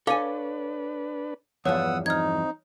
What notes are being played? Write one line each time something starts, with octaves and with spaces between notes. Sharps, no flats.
D4 A4 B4 C#5 F5 G#5 D6
E2 G2 F3 B3 C#5 F#5 D#6 E6
C4 D#4 F6 G#6